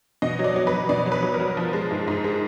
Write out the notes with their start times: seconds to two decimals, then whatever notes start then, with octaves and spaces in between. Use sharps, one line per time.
0.22 B2 D#5
0.39 F#3
0.44 D5
0.56 F#3
0.67 B4
0.73 F#3
0.89 B2 D5
1.06 F#3
1.12 B4
1.23 F#3
1.34 A#4
1.40 F#3
1.57 F3
1.73 G#3
1.91 G#2
2.08 G#2
2.24 G#3